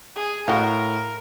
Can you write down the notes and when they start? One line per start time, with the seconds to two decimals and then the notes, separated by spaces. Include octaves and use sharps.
0.16 G#4
0.48 A2 F#4 A#4 D#5 F5